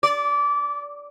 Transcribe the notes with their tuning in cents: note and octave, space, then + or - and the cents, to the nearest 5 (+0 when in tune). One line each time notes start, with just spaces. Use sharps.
D5 -20